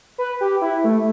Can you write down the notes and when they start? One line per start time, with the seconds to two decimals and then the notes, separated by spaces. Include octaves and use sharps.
0.18 B4
0.41 G4
0.62 E4
0.84 A3